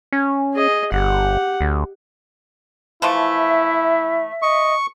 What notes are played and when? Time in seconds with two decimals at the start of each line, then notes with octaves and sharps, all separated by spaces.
0.13 C#4
0.54 G#4 D#5
0.92 G1 G4 F#5
1.61 D2
3.02 E3 F3 A3 E4 E5
4.42 D#5 C#6